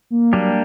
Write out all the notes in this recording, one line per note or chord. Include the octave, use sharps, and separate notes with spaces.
A#3
F#3 G3 A#3 D4 G4